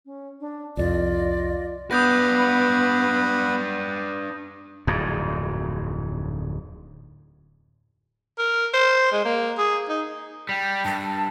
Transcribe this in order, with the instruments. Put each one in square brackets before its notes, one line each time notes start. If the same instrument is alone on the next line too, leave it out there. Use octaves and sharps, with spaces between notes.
[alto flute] C#4
D4
[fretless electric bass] C2 F2 [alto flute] F4 [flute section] D5 D#5
[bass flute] B3 [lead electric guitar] D4 B4 [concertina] F#5 B5 [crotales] D#6 G6 A#6
[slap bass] D1 F2 G#2
[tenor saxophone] A#4
C5
G#3
A#3
G#4
D#4
[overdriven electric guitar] G3 [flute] G5
[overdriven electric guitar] G2 [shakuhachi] A5